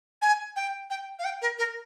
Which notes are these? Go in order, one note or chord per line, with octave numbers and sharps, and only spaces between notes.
G#5
G5
G5
F5
G5
A#4
A#4